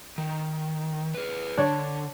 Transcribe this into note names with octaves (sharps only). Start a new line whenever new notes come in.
D#3
G#4 B4
D3 D4 C#5